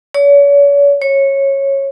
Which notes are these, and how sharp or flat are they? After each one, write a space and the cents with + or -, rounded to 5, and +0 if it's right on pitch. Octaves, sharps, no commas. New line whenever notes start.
C#5 +40
C#5 -15